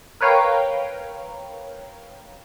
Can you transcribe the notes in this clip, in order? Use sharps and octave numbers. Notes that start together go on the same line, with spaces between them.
A#4 B4 C#5 F5 G5 A#5